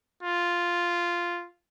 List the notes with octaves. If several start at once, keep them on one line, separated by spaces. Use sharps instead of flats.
F4